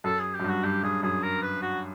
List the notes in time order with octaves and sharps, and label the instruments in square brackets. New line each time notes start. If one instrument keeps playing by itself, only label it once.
[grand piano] F#2 [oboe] A4
[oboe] G#4
G4
[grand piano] F#2
G2
[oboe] F#4
[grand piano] G2 [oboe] G4
[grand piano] G2 [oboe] G#4
[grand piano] F#2 [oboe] G#4
[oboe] A#4
B4
F#4